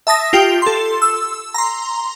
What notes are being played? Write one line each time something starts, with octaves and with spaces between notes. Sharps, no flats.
E5 A5 D#6 A#6
F4 G4 G5
A4 C6
E6
A#5 C6